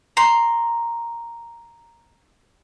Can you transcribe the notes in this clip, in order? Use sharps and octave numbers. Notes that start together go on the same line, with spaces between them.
A#5 C6